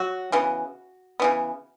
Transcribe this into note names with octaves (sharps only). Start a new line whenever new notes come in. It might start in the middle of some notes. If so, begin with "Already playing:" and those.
Already playing: F#3 F#4
C#3 E3 B3
C#3 E3 B3